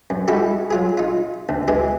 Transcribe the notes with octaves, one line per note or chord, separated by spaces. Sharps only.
F#2
G3 G#3 D#4 E4 F#4 G4
F#3 F4 G#4
D#4 F4
D2
E3 G#3 G4 G#4